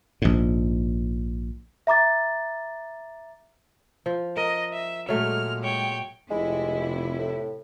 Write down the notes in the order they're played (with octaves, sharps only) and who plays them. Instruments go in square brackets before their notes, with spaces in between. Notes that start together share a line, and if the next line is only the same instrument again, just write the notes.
[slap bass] A#1 G#2
[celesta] E5 A#5 D6 A6
[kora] F3
[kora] A#4 [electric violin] D#5
[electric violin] E5
[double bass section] A#2 G#3 [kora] F#3 A3 [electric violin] F6
[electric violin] C#5 G5
[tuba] F1 [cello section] C3 E4 [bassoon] G#3
[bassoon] A2